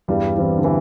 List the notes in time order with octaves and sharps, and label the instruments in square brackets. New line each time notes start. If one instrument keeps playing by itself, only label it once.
[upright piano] E2 [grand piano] G2 G3
[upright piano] E3 C4 E4
[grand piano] D3
E3